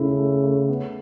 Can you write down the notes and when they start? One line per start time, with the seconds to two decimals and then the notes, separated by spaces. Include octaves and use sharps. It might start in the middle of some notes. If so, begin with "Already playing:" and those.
Already playing: C#3 A3 C#4 E4
0.19 A3
0.44 A3
0.69 B3